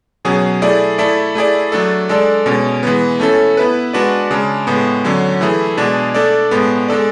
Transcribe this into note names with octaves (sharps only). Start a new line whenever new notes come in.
B2 F#3 C#4 G#4
A3 E4 G#4 D5
A3 E4 A4 D5
A3 E4 G#4 D5
F#3 A3 D4 A4
G#3 D4 A4 D5
B2 G#3 C#4
E3 G#3 B3
A3 C#4 E4 A4
B3 E4 B4
G#3 D4 F#4 B4 D5
C#3 G#3 D4
A2 G#3 B3
D3 F#3 C#4
E3 A3 E4 G#4
B2 G#3 D4 G#4
A3 D4 A4 D5
A2 G#3 B3
G#3 D4 A4 D5